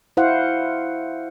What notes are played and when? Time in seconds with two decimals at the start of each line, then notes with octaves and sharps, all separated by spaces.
0.17 E4 C5 F5 F#5